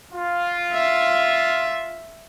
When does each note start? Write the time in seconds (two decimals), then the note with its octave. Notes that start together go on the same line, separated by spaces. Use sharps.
0.13 F4
0.73 E5